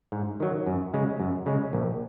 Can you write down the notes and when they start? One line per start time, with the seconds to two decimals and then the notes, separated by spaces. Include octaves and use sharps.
0.12 G#2
0.40 D#3 F#3
0.66 F#2
0.94 C#3 G#3
1.20 F#2
1.46 C#3 G#3
1.73 A#1